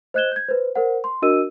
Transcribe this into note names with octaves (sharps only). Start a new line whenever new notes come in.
C5 D#5 F#6 G#6 E7 G7
G6 G#6
B4 C5
A#4 C5 F#5
C6
D4 F#4 A#4 D#5 E6 D#7